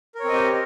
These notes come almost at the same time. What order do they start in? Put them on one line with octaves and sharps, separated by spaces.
A#4 C#5 C4 D#5 G4